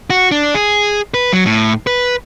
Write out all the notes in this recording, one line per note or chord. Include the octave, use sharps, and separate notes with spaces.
F#4
D4
G#4
B4
F#3
A2
B4